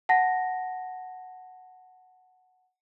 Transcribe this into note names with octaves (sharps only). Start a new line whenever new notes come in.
F#5 A5 A#6